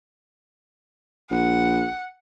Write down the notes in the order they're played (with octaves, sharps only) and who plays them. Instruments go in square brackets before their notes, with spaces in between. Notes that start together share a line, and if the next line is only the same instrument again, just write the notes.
[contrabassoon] A#1 [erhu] F#5